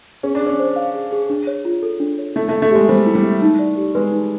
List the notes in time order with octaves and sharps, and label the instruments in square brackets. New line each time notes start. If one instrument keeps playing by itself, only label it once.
[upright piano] C#4 [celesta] G#4
[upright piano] D4
[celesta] G#4
[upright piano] C#4
[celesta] C5
F5
G#4
G#4
D4
C#5
F4
A4
D4
C#5
[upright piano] A3 [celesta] E4
[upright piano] A3
[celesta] E5
[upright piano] A3
[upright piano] G#3 [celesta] G4
[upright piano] G3 [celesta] C5
[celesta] E4
[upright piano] G3
[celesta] E5
D#4
D5
G4
[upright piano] G#3 [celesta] B4
[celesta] D#4